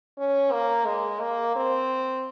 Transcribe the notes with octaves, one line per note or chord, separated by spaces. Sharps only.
C#4
A#3
G#3
A#3
C4